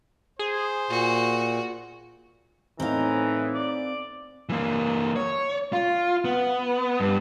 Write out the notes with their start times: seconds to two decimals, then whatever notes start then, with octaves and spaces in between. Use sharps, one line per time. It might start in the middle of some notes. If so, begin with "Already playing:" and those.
0.39 G#4 C5
0.90 A#2 F#4
2.80 A2 E3 C4 D#4 F5 A#5
3.54 D5
4.49 E3 A#3
5.16 C#5
5.73 F4
6.25 B3
7.00 G2